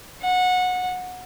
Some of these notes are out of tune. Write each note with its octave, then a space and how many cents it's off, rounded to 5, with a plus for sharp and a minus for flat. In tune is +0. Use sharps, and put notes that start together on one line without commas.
F#5 -20